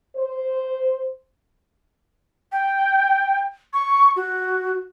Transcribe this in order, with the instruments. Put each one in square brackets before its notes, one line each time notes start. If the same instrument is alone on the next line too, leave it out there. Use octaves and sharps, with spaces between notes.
[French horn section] C5
[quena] G5
C#6
F#4